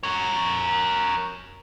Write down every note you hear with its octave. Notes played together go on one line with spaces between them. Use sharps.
A#4 C#5